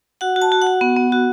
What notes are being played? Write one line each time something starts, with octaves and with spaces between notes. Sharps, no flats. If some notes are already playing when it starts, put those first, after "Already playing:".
F#4 F#5
F#4
A5
F#4
F#5
F#4
B3
B3
F#4